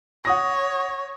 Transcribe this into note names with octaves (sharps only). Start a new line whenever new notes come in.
C#5 F#5 D#6 A#6